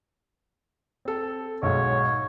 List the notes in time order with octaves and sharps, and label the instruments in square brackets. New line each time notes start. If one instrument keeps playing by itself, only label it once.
[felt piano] C4 A4
[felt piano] B1 G#2 [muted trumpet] C#5